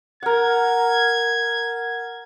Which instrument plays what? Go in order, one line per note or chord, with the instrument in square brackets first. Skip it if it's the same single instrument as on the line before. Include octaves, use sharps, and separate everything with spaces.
[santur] A#4 F#5 [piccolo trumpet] G#6